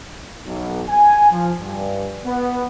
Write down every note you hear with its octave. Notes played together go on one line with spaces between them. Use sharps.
B1
G#5
F3
G2
B3